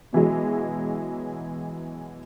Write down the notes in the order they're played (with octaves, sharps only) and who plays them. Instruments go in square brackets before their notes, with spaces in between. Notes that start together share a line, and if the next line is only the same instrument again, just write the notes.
[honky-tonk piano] B2 E3 F#3 G#3